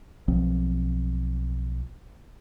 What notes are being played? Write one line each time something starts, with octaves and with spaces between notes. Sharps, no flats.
B1 F3 C4